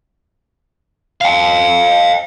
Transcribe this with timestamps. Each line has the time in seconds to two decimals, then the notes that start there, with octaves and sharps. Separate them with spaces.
1.21 F5 G5